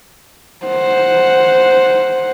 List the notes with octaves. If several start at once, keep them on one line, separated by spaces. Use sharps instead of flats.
C5 F#5